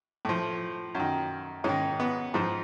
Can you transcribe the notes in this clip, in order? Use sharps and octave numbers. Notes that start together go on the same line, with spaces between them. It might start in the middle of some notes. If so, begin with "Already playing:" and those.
A2 F3
F#2 D#3
G#2 D#3 C#4
B3
G#2 F3